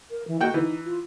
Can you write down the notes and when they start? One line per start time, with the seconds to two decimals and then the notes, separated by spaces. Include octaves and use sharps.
0.11 A#4
0.28 E3
0.41 A#3 F#4 G5
0.54 E3 D#4
0.85 F4